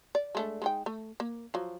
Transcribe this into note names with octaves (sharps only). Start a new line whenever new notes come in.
D5
G#3 A3 D4
G#3 D#4 G5
A3
A#3
F3 F#3